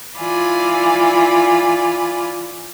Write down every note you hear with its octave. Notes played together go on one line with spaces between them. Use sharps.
E3 F4 D5 G#5 B5